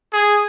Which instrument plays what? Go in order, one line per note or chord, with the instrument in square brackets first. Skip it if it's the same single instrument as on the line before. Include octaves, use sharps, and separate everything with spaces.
[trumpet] G#4